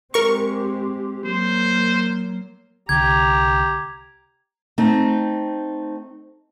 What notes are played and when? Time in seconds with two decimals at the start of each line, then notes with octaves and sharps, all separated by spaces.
0.14 G#3 C4 G4 A#4 C#6
1.25 F#3 A#3 C5
2.89 C2 D3 G4 A#5 G#6
4.78 A3 C4 D#4